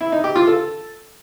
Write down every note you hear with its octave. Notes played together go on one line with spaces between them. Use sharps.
E4
D#4
G4
F4
A4